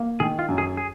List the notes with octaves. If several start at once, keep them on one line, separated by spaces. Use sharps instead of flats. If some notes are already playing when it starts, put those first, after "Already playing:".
Already playing: A#3
D#3 G#4
F4
F#2
G#4
G#4